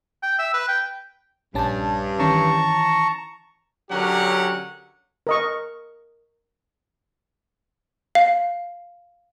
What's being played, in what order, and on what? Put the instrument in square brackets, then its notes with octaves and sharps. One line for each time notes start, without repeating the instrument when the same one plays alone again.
[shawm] G5
E5
B4
G5
[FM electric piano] A#1 C#4 A5 [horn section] G2
[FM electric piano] D#3 E3 C#4 [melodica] A5 A#5 C#6
[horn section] D3 F#3 C#4 G4 A#4 F#5
[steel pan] A#4 D#5 C#6
[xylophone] F5